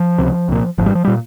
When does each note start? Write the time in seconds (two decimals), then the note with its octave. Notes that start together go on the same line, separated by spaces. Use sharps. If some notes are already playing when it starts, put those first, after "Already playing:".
Already playing: F3
0.18 C#2 C3
0.49 C2 A#2
0.78 G#1 G#2 F3
0.86 G3
0.95 F3
1.05 A#2 G3